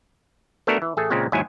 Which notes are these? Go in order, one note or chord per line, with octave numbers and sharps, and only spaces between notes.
A3 B3 D4 F#4 A4 A#4
E3
A1 A3 G#4 A4 G#5
A#2 C#3 G#3 A#3 C4
D#2 G#2 F#3 G#3 E4 G#5